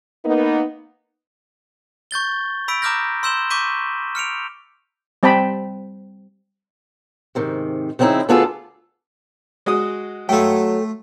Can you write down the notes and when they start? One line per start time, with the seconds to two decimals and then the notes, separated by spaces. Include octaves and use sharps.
0.25 A#3 B3 D#4
2.11 C#6 G6 A6 G7
2.68 B5 E6 B6 D7
2.82 A#5 D6 D#6 F6 G6 A#6
3.23 C6 E6 G6 E7 F#7 G7
3.50 C#6 D6 G6 B6 D#7
4.15 F6 C#7 D7 F7
5.23 G3 C4 G5 A5 B5
7.35 G#2 C3 D#3
7.99 C#3 F3 B3 C4 D#4 E4
8.29 D2 B3 D4 F4 G#4 A4
9.66 G#3 F#4 D#6
10.29 F#3 A3 F4 A4 G5